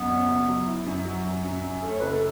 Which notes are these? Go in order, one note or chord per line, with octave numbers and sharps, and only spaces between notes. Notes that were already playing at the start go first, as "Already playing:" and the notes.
Already playing: B1 F#2 B3
C#4
F#1
F#3
E4
F#2
F#3 C#4
F#2
F#2
F#2
A3
C#5
F#1 B4
A4